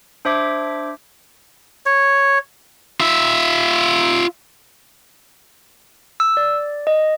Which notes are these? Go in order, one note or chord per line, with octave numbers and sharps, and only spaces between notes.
D4 C5 E5 D6 G#6
C#5
F4 E5
E6
D5
D#5